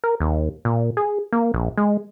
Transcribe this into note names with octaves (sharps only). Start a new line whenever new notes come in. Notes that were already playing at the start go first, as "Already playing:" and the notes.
A#4
D#2
A#2
G#4
A#3
A#1
G#3